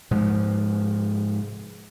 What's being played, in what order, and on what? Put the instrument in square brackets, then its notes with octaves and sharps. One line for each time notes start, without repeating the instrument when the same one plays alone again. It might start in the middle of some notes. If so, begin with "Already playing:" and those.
[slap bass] G#2 C3 F3